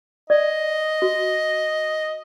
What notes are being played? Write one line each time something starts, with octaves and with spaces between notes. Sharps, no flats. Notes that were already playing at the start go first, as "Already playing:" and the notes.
D5 D#5
F#4